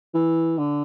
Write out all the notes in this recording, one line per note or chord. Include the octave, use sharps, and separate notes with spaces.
E3
D3